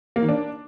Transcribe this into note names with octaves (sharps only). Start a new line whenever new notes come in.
A#3
D#3
D4